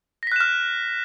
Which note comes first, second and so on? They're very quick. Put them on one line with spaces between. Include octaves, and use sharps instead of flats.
A#6 B6 F#6 E7 F6